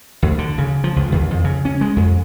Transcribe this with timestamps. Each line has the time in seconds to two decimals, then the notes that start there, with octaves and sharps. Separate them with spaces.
0.22 D2
0.38 D3
0.58 C#3
0.84 F3
0.96 C#2
1.12 D#2
1.31 F2
1.44 C#3
1.65 C#4
1.81 G#3
1.96 F2